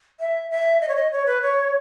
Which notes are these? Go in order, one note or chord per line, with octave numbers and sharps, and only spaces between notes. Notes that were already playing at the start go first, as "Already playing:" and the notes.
E5
E5
D#5
C#5
D#5
C#5
B4
C#5